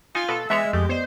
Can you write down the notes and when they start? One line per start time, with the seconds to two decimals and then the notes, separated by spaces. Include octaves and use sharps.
0.15 D#4 F4 G#5
0.28 B2 A4 B4
0.50 E3 G#3 B3 C#5 E5
0.73 F2 A3 G4
0.89 B3 C5 D5 D#5